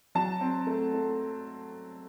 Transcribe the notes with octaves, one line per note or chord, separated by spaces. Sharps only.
F#3 A5
C4
A3
A3